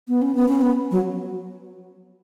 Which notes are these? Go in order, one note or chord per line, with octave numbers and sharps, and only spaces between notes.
B3
C#4
B3
C#4
B3
F#3